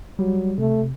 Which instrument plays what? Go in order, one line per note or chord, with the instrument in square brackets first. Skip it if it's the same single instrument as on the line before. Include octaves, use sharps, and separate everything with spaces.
[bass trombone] F#3 [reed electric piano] G3
[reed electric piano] C3 [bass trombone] A3